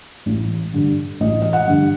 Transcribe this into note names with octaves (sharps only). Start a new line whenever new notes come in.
A1
G2 D3
A1 D#5
D#5
F#5
G2 D3